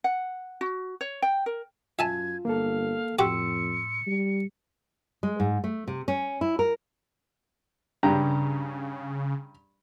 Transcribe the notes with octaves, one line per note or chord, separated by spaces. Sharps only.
F#5
F#4
C#5
G5
A#4
F#2 F4 E5 G#5 A5 G#6
G1 A#3 A4 F5
F2 A2 F#4 G4 G5 C6 E6 C#7
G3
G#3
G#2
A3
C3
C#4
E4
A#4
G2 C#3 G4 A#5